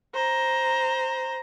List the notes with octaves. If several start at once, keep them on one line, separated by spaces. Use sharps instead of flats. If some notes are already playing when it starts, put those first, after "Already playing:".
C5 A#5